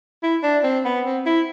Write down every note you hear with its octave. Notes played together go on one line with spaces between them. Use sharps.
E4
D4
C4
B3
C4
E4